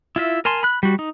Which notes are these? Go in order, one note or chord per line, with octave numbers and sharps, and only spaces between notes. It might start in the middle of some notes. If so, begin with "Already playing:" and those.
E4 F4 E5
A#4 G#5 A5 C6
B5 F#6
G3 F#4
D#4